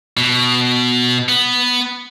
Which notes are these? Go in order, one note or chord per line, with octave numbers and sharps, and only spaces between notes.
B2
B3